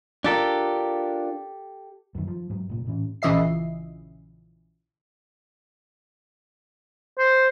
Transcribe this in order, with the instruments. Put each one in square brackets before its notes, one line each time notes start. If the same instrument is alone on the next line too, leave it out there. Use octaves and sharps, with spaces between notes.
[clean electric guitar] D4 F4 A#4 [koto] G4 A4
[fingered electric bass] F#2 D#3
F3
G#2 F#3
F1 A#2
A2 E3 C#4
[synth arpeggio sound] A#1 C#3 E3 D#5 E5 C7
[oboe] C5